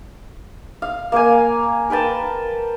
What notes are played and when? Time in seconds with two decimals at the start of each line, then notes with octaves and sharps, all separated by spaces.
0.82 F5
1.12 A#3 A#4 F5 G#5
1.90 A#4 B4 G5 A5